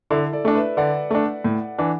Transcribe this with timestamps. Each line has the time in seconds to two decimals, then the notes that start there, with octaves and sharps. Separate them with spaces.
0.10 D3 E4 A4
0.33 A4 D5
0.45 A3 D4
0.55 B4 E5
0.77 D3 D5 F#5
1.11 A3 D4
1.44 A2
1.78 E3 D4